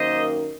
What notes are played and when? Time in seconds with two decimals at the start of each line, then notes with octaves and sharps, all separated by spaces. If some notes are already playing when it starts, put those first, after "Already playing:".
Already playing: F#2 D#3 A#3 C5 D#5